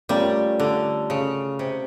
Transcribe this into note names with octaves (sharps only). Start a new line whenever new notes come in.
G3 A3 C#4 F4 A#4 D5
D3
C#3
C3